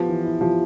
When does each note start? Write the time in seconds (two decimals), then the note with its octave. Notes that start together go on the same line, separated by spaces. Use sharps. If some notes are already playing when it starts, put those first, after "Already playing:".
Already playing: F3 B3 G4
0.09 E3
0.25 E4
0.41 F3 G4